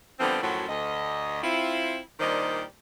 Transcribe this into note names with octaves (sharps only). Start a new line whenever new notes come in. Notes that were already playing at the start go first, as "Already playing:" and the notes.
D3 F3 G3 B3 C4
F#2 A2 F3 F#3
D2 D#5
C4 E4 F4
A#2 D#3 G3 D4 C5 D#5